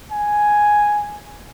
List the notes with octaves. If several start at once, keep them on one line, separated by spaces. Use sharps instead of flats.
G#5